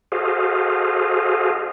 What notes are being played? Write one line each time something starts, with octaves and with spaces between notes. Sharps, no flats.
F#4 G#4 A4 C5 D#5 F5